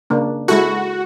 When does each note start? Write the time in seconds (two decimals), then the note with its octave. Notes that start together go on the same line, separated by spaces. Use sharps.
0.10 C#3 A#3 D4
0.48 G#3 E4 F#4 A4